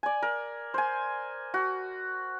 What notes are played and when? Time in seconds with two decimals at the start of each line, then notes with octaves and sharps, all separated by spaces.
0.03 D5 G#5
0.22 A#4
0.74 C5 G#5
1.54 F#4